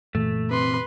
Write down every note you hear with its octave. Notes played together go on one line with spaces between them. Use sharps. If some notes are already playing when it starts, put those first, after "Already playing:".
F#2 A#2 E3 A3
C3 B4 C6